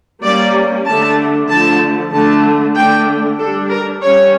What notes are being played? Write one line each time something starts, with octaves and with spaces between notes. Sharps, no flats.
G3 A#3 C#4 D5
D3 A3 D4 A5
D3 F3 A3 A5
D3 A3 D4 A5
D3 A3 D4 G5
G3 D4 A4
A#4
G3 C#4 C#5